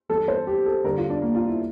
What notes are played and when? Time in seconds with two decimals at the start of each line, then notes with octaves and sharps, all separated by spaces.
0.09 G2 E3 A4
0.28 C5
0.47 G4
0.66 A4
0.84 G2 D3 A#4
0.97 F4
1.10 D4
1.22 A#3
1.35 F4
1.47 E4